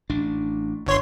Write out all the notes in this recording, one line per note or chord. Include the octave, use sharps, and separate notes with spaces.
A1 D4
G1 C#5 C6